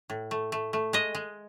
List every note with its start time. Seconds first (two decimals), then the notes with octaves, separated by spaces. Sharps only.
0.10 A2
0.31 A3
0.52 A3
0.73 A3
0.93 G#3 D#5
1.15 G#3